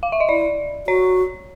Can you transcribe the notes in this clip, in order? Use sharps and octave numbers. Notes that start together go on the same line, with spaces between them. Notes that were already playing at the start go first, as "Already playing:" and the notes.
F5
E5
D#5
E4 D5
F#4 C#5